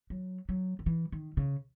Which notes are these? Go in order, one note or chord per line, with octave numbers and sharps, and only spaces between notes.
F#3
F#3
D#3
E3
D#3
C#3